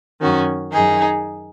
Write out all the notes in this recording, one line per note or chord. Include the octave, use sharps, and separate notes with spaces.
F#2 D#3 C#4 F#4
F#2 D#3 D#4 G#4